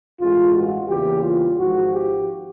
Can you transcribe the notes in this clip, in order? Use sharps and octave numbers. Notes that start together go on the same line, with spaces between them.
A1 G2 E3 G#3 F4
F#4
E2 C#3 E3 G3 A#3 G4
F4
G#1 G#2 F3 F#4
G4